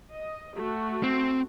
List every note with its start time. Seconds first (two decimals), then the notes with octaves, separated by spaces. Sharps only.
0.13 D#5
0.57 A3 F#4
1.03 C4